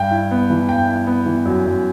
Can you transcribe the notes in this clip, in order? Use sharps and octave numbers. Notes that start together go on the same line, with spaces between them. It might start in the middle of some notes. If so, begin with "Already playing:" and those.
Already playing: G2 G5
E4
B3
E3
G2 G5
E4
B3
E3
F#2
F#2